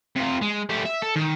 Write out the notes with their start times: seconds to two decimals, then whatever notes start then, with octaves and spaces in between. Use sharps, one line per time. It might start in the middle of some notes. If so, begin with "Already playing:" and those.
0.16 C3 F4
0.42 G#3
0.70 A3 G4
0.85 E5
1.02 A4
1.16 D#3